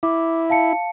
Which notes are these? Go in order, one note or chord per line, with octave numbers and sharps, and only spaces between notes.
E4 D6
F5 A5 C#7